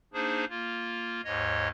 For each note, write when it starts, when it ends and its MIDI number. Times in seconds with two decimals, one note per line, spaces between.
0.13 0.45 58
0.13 0.45 62
0.13 0.45 63
0.13 0.45 68
0.13 0.45 72
0.49 1.21 58
0.49 1.21 65
1.25 1.68 39
1.25 1.68 44
1.25 1.68 73
1.25 1.68 75